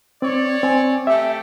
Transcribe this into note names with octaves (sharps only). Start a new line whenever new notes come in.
C4 C#5 D5
C4 G#5
A3 G4 E5